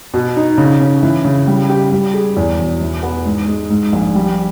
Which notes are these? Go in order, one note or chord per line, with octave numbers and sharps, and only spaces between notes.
B2
D#4
C#3
C#4
E3
C#3
G3
G4
G3
G#4
E2
E1
E3
B3
G#2
G#3
G#2
A#1
G3